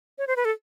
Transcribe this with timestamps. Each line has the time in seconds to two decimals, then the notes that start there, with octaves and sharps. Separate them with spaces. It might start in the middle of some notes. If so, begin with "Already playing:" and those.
0.18 C#5
0.27 C5
0.36 B4
0.45 A4